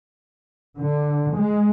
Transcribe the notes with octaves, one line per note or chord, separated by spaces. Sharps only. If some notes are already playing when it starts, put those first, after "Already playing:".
D3
G#3